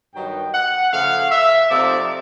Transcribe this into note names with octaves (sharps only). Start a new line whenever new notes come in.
G2 D#3 F#3 B3 D#4 G5
F#5
C#3 F3 A3 C#4 F5
E5
C3 F3 A3 C4 D#4 D5